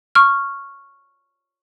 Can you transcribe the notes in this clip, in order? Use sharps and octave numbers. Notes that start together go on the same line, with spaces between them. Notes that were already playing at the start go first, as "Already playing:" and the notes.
C#6 F6